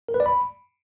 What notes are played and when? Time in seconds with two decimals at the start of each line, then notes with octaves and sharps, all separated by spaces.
0.09 A#4
0.14 B4
0.20 D5
0.26 B5